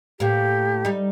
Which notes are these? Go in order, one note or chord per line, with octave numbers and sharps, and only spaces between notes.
A2 A#3 G4
G3 D#4